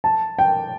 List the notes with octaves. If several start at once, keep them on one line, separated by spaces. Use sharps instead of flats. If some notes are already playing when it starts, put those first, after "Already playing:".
A5
G5